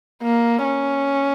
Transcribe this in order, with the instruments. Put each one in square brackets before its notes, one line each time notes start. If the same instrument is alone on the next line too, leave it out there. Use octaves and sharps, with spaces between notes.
[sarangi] A#3
C#4